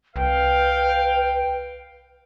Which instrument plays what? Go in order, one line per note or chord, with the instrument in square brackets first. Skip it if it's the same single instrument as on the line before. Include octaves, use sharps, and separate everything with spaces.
[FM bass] C2 [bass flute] B4 [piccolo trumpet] F5 [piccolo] G5